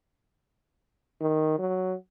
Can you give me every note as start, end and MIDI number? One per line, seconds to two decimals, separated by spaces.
1.21 1.58 51
1.59 1.94 54